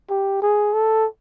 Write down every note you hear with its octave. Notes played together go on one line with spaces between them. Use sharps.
G4
G#4
A4